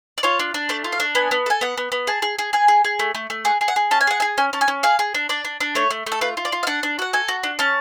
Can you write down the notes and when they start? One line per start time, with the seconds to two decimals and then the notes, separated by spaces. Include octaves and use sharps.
0.18 D5
0.23 F4 C#5
0.40 D4
0.54 D4
0.69 A3 D5
0.84 F4
0.92 F5
1.00 D4
1.15 B3 G#5
1.31 B3
1.46 A4 G#5
1.61 B3 F#5
1.77 B3
1.92 B3
2.07 G#4 A5
2.22 G#4
2.39 G#4
2.53 G#4 G#5
2.68 G#4
2.85 G#4
2.99 A3
3.15 A3
3.30 A3
3.45 G#4 F#5
3.61 G#4
3.68 F#5
3.76 G#4
3.91 C#4 A5
4.01 G#5
4.07 G#4 F#5
4.20 G#4 G#5
4.38 C#4 G#5
4.53 C#4 A5
4.61 G#5
4.68 C#4
4.83 G#4 F5
4.99 G#4
5.14 D4
5.29 D4 D5
5.45 D4
5.60 D4
5.75 A3 C#5
5.91 A3
6.06 A3
6.12 A4
6.21 F4 B4
6.37 F4
6.45 D5
6.52 F4
6.63 F5
6.67 D4 F#5
6.83 D4
6.99 F#4 F#5
7.13 A4 G#5
7.28 F#4
7.43 D4
7.59 C#4 A5